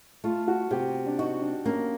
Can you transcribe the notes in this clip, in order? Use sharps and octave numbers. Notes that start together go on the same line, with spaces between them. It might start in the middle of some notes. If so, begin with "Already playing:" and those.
A3 F4
F#4
C3 G4
D4
D#4 F#4
D4
A#3 C#4